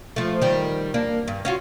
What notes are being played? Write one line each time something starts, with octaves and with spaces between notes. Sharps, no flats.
F3 A3
D#3 G3
A#3 D4
G2
C#4 F4 F#4